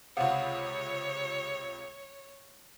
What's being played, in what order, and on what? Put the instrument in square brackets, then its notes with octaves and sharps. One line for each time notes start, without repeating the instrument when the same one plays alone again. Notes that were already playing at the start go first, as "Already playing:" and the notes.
[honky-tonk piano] C#2 C3 [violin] C#5 [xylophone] F5 F#5